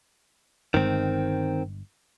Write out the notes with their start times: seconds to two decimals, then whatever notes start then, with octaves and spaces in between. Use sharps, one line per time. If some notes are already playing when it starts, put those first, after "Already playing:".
0.74 G1 G2 D#3 G#3 C4